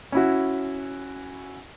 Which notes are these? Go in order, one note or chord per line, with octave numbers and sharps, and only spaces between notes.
C#4 E4 F#4